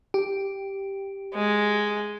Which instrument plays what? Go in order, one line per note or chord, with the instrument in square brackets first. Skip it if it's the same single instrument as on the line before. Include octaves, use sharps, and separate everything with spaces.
[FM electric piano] G4
[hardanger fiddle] G#3